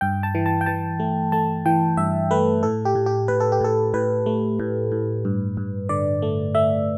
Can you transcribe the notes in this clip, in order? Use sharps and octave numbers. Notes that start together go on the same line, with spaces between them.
G2 G5
A5
E3
A5
G5
E3 A5
A3
A3 A5
E3 G5
G2 E5
A3 B4
A2 A4
G4
A2
G4
A2 B4
A4
G4
A2 A4
A2 B4
A3
A2
A2
G2
G2
D3 D5
A3
A3 E5